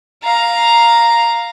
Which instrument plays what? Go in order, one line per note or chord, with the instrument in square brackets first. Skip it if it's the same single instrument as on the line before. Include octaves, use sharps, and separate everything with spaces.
[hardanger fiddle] F5 A#5